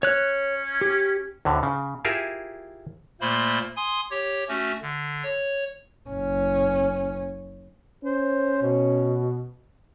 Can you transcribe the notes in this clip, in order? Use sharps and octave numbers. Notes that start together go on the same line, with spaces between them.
C#4 C#5 F#6
G4
D2 A2 D3
C#3
E4 F4 G4 G#4 A#4 E5
A#2 A3 A#3 C5 B5 C6
G#5 C6 D#6
G4 C#5
A3 C#4 F#4
D3
C#5
F#1 C#4
C#4 C5
B2